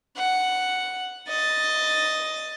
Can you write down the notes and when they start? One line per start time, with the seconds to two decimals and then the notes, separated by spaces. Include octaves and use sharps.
0.17 F#5
1.29 D#5 A6